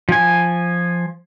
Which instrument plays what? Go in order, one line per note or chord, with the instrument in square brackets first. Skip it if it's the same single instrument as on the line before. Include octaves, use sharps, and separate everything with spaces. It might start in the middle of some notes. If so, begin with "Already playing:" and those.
[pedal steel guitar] F3 G#5